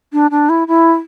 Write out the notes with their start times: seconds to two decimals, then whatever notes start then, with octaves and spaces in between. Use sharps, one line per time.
0.13 D4
0.31 D4
0.49 E4
0.68 E4